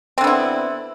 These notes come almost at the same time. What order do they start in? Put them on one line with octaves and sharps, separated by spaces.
C4 D3 B3 E4